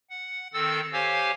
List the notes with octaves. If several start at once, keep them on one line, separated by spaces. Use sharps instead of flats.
F#5
D#3 C4 A4 E6 A6
G4 C5 C#5 F5 G#5